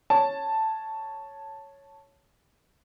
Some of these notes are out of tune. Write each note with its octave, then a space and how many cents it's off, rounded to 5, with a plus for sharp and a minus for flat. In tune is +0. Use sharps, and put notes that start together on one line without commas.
C#5 +0 A5 +0